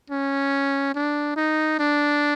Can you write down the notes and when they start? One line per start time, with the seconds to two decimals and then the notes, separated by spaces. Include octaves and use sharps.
0.10 C#4
0.95 D4
1.36 D#4
1.79 D4